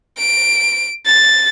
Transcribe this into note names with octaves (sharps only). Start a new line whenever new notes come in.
D7
A6